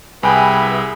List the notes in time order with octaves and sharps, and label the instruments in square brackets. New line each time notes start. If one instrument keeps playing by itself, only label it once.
[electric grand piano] C2 G5 B5 [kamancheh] G#4 E5 [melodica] B4 [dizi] G#5